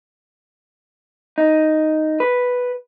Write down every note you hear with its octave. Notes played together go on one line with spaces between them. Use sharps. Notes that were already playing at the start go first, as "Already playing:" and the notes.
D#4
B4